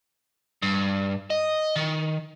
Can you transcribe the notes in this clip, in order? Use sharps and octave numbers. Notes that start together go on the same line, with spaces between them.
G2
D#5
D#3